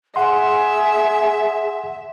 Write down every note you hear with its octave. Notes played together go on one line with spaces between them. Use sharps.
G#4 E5 F#5 C6